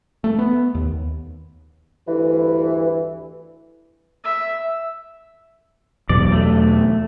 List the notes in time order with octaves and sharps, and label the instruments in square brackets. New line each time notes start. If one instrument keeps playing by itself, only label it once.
[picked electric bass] A3
B3
D#2
[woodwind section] D2 G2 E3
[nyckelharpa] E5
[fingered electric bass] E2 B2 F#3 [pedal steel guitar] D5
[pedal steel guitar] A3